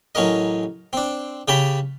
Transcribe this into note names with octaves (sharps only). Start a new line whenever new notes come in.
A1 F#3 C#4 A#4 D#5
C4 D4
C#3 C#4 G4 G5 A5 B5